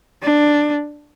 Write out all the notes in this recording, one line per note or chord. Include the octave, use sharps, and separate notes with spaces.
D4